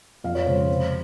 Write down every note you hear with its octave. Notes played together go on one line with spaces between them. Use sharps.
F2 F5
C#5
C#3 G#3 C#4 C5
C5
C3